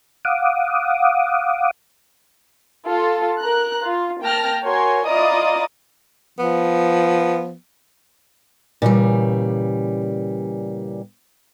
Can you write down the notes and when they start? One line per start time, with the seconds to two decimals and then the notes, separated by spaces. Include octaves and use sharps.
0.25 F5 F#5 D6 D#6
2.87 F4 A4
3.40 A#4 A#5 F#6
3.84 F4
4.22 A#3 G5 A5 F6 A#6
4.65 F#4 A#4 C#5 G#5 C6
5.08 E4 F4 D5 D#5 A#5 D#6
6.39 F3 B3
8.82 A#2 C#3 E3 G3